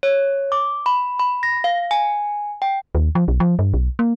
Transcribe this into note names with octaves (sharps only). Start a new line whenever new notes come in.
C#5
D6
B5
B5
A#6
F5
G#5
G5
D#2
F3
B1
F3
G2
B1
A#3